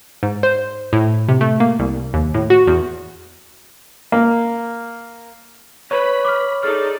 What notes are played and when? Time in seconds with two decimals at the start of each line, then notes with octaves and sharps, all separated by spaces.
0.23 G#2
0.43 C5
0.93 A2
1.29 C3
1.41 A3
1.60 A#3
1.79 C2
2.14 D#2
2.34 A2
2.50 F#4
2.67 E2
4.12 A#3
5.91 B4 C#5 B5
6.25 D6 F6
6.63 D#4 G#4 A4 D5 F6